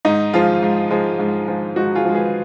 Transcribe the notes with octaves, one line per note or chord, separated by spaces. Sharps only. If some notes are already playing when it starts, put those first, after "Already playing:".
G#2 D#4
F3 G#3 F4
G#2
F3 G#3
G#2
F3 G#3
G#2 D#4 F#4
F4 G#4
F3 G#3
G#4 B4